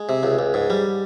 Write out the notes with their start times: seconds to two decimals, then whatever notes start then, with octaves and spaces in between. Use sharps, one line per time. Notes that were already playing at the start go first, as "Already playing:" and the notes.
Already playing: G#3
0.09 C3
0.23 C#2
0.39 C#2
0.54 G#2
0.70 G3